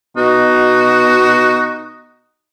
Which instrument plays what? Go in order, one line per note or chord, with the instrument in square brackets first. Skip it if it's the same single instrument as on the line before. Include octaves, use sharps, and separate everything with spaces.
[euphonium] B2 [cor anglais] D#4 [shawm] F#4